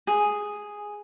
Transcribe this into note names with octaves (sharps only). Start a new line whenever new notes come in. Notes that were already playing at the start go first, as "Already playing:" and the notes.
G#4